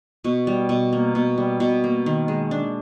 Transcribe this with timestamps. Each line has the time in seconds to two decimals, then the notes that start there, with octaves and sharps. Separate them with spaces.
0.24 B2
0.47 G3
0.69 B2
0.93 A#3
1.15 B2
1.38 G3
1.60 B2
1.84 A#3
2.06 D#3
2.28 G#3
2.51 D4